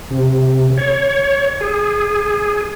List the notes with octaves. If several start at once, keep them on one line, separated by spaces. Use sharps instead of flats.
C3
C#5
G#4